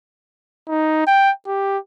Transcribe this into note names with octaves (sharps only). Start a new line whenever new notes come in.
D#4
G5
G4